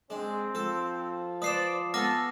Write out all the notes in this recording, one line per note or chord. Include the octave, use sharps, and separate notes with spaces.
G#3 C4 D4
F3 A4
B4 C5 D5 D#6 C7 E7
B3 A4 G#5 D6 F6 A#6